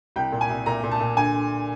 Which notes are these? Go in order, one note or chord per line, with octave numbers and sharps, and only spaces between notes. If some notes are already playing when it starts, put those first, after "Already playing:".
C2 G5
A#2
G#5
C2
A#2 A#5
A#2
A5
A#2
D3 G#5
D3